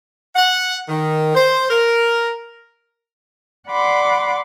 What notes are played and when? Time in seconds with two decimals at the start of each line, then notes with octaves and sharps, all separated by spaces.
0.36 F#5
0.88 D#3
1.35 C5
1.70 A#4
3.69 D5 F#5 B5 C6 D6